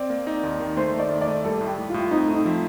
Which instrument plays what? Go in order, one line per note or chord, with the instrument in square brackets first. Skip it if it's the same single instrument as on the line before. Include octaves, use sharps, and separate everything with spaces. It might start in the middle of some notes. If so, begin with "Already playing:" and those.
Already playing: [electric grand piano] C4 [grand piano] D5
[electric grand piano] A#3
D#4
D#2
D#3
[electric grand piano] A3 [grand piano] C5
[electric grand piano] A3
[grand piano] D5
[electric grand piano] D#3
[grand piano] D5
[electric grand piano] A3
[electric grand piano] G3 [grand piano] A4
[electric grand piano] A2
[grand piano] G4
[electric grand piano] A2
[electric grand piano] A2 [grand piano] F4
[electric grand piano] C4 [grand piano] D#4
[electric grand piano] A3
[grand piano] D#4
[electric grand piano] F3